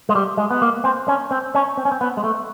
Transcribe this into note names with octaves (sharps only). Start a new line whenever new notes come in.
G#3
G3
G#3
B3
A#3
C4
C#4
C4
C#4
C4
C#4
C4
B3
G#3
A3